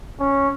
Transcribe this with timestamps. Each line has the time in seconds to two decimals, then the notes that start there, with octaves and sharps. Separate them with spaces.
0.20 C#4